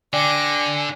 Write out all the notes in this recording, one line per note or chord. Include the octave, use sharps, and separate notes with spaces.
D3 D5 G5 G#5 D6 A#6